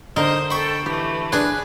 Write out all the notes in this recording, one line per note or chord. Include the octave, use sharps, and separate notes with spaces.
D3 D#4 A#4 C5 D#6
A4 G5 B5 C#6
E3 A3 G4
D4 G#4 B4 G#5